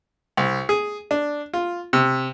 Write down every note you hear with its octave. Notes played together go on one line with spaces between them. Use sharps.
C2
G#4
D4
F4
C3